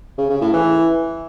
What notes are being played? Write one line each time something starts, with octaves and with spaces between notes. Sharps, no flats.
C#3
C#3
A2
E3